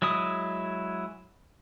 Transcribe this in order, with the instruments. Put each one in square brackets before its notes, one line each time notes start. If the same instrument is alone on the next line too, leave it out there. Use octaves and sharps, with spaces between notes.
[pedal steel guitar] F#3 G#3 E4 D#6